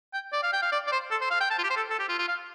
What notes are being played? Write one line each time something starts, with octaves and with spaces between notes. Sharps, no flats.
G5
D5
F5
G5
F5
D5
D5
C5
A4
C5
F5
G5
A5
F4
G4
C5
A4
A4
G4
F4
F4
F5